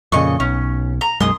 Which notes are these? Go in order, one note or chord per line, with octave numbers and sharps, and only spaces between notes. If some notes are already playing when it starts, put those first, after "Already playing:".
F2 A#2 C#3 D#5 C#6
B1 C#4
A#5
B1 F#2 G#3 C6 D#6